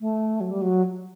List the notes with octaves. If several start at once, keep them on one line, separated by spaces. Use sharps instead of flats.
A3
F#3
G3
F#3